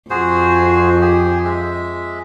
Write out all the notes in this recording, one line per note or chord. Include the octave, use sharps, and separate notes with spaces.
F2 F#4 G#4 C5
G4 G#4
G#3 E5